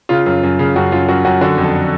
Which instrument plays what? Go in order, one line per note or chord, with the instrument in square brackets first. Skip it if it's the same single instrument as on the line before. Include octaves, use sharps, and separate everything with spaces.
[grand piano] C#3 F4
F#2
F#2
C#3
F#2 F#4
F#2 F4
F#2 F#4
F#2 F#4
D3 F#4
F2
A4